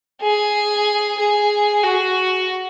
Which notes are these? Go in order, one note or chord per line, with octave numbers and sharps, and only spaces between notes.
G#4
G#4
F#4